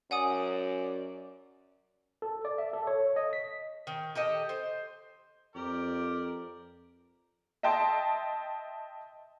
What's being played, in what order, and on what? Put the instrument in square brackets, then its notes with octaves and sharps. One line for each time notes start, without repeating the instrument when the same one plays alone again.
[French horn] F#2 [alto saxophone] D5 [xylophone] F#5 G#5 D#6
[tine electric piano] A4
D5
E5
A4
C#5
D#5
B6
[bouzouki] D#3
G4 A4 D#5
C5
[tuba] F2 [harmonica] G4 A#4 D5
[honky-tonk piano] D#5 E5 G5 A5 C6